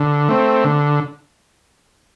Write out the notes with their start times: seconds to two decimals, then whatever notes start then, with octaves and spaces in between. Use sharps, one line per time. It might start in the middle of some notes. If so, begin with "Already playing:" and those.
Already playing: D3
0.28 A3 C4
0.64 D3